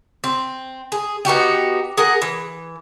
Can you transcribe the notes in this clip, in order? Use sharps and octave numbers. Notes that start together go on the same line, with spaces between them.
C4
G#4
B3 D#4 F#4 G4
G#4 A#4 F#5
E3